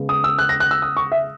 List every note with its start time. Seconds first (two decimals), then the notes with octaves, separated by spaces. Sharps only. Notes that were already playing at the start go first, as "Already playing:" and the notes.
Already playing: C#3 G#3 B3
0.09 D#6
0.24 E6
0.38 F#6
0.49 A#6
0.60 F#6
0.71 E6
0.82 D#6
0.97 C#6
1.12 E5